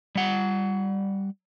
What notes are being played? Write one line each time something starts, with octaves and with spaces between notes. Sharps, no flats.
G3 F#5